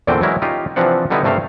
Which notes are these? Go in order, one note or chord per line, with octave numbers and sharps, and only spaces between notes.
E2 A#2 D3 A3 C4 G5
E3 F#3 G#3 E4 A#4
C#4 D#4 F4 G4
C3 E3 F3 C4 D4 F#5
D3 G3 B3 D#4 E4 B4
G2 C3 A3 A#4 C5 F5